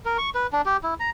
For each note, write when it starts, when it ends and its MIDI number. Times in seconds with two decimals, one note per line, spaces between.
0.05 0.17 70
0.18 0.30 85
0.35 0.47 71
0.53 0.61 62
0.66 0.77 67
0.84 0.94 64
1.00 1.10 82